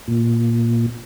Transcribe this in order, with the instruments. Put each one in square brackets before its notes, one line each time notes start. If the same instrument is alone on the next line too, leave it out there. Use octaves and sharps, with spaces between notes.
[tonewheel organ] A#2